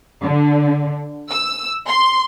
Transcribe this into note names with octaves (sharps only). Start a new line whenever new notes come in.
D3
E6
C6